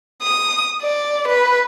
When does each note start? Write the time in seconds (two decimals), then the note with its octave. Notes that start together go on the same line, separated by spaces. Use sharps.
0.22 D#6
0.82 D5
1.27 B4